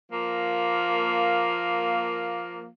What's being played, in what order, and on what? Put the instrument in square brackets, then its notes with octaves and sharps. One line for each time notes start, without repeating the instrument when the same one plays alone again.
[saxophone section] F3 A#3